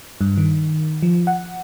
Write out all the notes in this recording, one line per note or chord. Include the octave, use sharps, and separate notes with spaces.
G2
D#3
F3
F#5